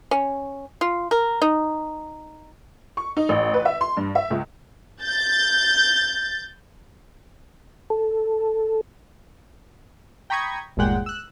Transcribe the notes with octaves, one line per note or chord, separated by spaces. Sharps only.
C#4
F4
A#4
D#4
C#6
D#4
A1
B4
E5
C6
G2
E5
C#2
G6 A6
A4
G5 A#5 B5 C#6 D#6 G#6
G1 D#2 A#2 G#3 F#5 G5
E6 F#6